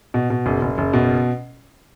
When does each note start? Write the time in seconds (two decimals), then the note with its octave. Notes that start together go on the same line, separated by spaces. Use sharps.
0.14 B2
0.30 B2
0.46 F#1
0.61 F#1
0.78 F#1
0.93 B2